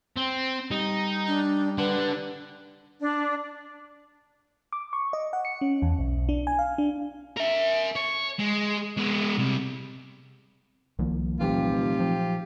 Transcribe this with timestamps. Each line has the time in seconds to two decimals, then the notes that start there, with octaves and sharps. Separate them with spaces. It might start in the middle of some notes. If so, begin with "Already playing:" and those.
0.16 C4
0.71 G3 D#4
1.28 D4
1.78 D4 B4 F#5
3.00 D4
4.73 D6
4.93 C#6
5.13 D#5
5.33 F#5
5.45 C#7
5.61 C#4
5.82 E2
5.98 B1
6.29 D4
6.47 G#5
6.59 F5
6.78 D4
7.37 A#4 E5
7.96 C#5
8.40 G#3
8.97 G#3 B3
9.38 C3 G3
10.99 C2 D#3 F3 A#3
11.41 F1 A#2 E3 F#3 F4 G4
12.00 F3